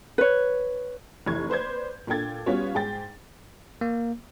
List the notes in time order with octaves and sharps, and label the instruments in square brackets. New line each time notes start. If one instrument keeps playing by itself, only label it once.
[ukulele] B4 C#5
[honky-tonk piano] F1 E3 C#6 G#6
B4 C5 D5 G6 G#6
A#2 D4 A4 G5 G#6 A6
G3 B3 C#4 F4 F#4 C#5
G#2 G#4 G5 A6
[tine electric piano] A#3